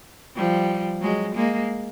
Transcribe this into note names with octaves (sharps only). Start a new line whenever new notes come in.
F3 G3
F#3 G#3
G#3 A#3